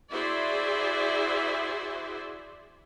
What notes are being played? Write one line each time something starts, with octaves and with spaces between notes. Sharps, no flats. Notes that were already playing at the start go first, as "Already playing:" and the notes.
E4 F#4 G#4 C5 D5 E5